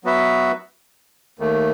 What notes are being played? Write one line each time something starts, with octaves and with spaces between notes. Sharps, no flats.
F#3 B3 F#4 B4 E5
D#2 D#3 A3